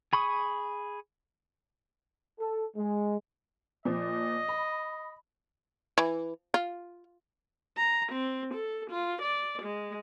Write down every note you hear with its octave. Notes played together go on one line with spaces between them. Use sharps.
G#4 B5 C#6 D#6
A4
G#3
A#2 F3 D#5
B5
E3
F4
A#5
C4
A4
F4
D5
G#3